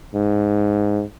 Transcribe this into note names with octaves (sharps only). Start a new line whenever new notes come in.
G#2